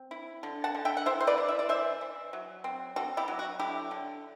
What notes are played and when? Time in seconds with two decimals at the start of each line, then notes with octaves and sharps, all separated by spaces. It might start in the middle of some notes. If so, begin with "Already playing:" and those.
Already playing: C4
0.11 E4
0.43 D3
0.64 F#5 A5
0.75 D3
0.85 E5 G5
0.97 F#5
1.06 E4 C5 E5
1.20 C5
1.27 B4 D5
1.38 E4
1.48 E5
1.59 D5
1.69 E3 C5 E5
2.01 E3
2.33 F#3
2.64 C4
2.96 C4 F#4 A4
3.17 E4 G4
3.28 F#3
3.39 F#4
3.59 D3 E4 G4
3.91 D3